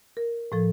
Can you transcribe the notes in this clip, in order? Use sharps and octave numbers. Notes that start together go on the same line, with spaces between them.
A#4
A2 F3 A4